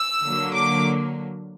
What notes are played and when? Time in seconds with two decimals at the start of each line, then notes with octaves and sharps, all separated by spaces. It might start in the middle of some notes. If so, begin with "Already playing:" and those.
Already playing: E6
0.23 D3 F#3 A#3
0.55 D6